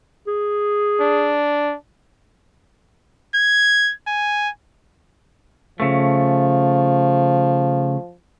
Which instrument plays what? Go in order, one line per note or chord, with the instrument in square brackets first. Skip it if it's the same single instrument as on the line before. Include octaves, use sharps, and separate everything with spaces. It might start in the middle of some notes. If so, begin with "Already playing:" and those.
[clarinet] G#4
[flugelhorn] D4
[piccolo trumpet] G#6
G#5
[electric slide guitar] C#3 A3 [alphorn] F3